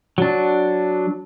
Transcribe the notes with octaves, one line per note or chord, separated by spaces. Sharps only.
F#3 D4